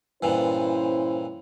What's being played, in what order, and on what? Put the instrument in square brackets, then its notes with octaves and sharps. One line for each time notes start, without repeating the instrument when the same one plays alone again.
[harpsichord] G2 A#2 E3 [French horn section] C#4 E4 C5